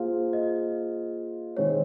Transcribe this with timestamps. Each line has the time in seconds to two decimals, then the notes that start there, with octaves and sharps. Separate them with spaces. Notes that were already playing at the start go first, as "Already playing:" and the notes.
Already playing: A#3 F4 G#4 C5 F5
0.33 D#5
1.57 D#3 G#3 C4 C#5